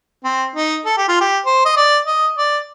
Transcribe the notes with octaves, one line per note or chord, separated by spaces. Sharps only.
C4
D#4
A4
G4
F4
G4
C5
D#5
D5
D#5
D5